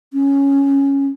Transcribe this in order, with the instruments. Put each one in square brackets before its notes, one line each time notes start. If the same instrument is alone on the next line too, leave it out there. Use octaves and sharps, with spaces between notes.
[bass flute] C#4